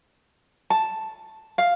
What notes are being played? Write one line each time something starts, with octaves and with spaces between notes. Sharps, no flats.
A5
F5